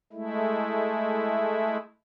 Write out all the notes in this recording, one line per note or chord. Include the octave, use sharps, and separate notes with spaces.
G#3 A3 E4